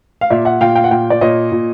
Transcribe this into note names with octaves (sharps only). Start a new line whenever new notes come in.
F5
A#2 D5 E5
E5 F#5
A#2 F5 G5
F5 G5
F#5
A#2 F5 G5
D5
A#2 C#5 D#5
A#2